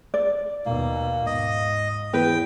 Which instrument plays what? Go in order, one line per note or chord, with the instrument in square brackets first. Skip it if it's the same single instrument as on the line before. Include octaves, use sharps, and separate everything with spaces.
[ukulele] D5
[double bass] D#2 B2 [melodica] A#3
[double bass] G#2 [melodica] D#5
[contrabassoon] E2 [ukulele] B4 [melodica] G5